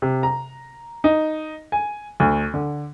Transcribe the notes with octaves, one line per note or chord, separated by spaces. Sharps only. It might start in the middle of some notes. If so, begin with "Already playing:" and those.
C3
A#5
D#4
G#5
D2
D3